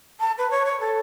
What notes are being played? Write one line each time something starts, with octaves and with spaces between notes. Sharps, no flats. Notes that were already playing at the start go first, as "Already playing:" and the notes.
A5
B4
C#5
C#5
A4